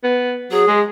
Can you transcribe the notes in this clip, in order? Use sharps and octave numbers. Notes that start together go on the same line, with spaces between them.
B3
F#3 G#4
G#3